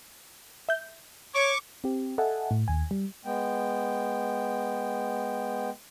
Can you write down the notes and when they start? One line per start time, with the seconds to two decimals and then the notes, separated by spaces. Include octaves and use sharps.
0.69 E5 G6
1.35 C#5 C#6 D6
1.84 C4 G4
2.18 A4 D#5 E5 F#5 G#5 A5
2.51 A2
2.68 D#2 G#5
2.91 G3
3.25 G#3 B3 G5